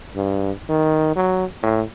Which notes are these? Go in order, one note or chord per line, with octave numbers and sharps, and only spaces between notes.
G2
D#3
F#3
A2